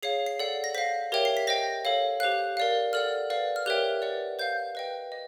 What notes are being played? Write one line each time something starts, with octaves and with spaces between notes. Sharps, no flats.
G#4 C#5 F5 C7
C7
A4 D5 F#5
A#6
C5 F5 B6
G4 A#4 C#5 E5 G5
C7
B6
C5 D#5 G5 A#6
A4 C#5 F5
G4 C5 F5 F#6
A#4 D5 F5
A4 D5 F#5 F6
B4 D5 F5
F6
G4 A#4 C#5 E5 G5 F#6
B4 D5 F#5
C5 F5 G6
B4 D#5 G5
D#5